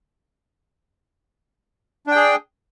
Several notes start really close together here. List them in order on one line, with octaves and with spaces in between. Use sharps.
D4 G5 G#4